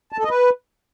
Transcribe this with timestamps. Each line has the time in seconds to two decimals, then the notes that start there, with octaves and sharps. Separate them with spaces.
0.12 A5
0.18 A4
0.24 D#5
0.29 B4